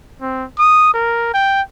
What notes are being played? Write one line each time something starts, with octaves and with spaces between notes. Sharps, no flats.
C4
D#6
A#4
G5